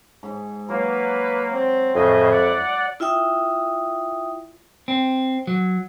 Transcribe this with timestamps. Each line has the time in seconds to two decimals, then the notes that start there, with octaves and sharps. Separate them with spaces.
0.23 G#2
0.69 F#3 A#3 B4
1.52 C4
1.95 F2 A2 C#3 E4 D#5
2.32 D5 F#5
3.00 E4 F4 E5 G5 D#6
4.88 C4
5.47 F#3